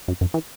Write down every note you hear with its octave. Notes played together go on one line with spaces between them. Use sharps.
F#2
F#2
E3